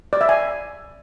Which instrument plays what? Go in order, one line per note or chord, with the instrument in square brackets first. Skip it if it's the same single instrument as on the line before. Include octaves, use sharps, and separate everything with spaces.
[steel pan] D5
E5
G#5